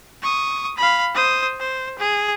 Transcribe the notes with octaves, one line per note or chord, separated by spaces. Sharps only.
C#6 D#6
F5 B5
C5 D#6
C5
G#4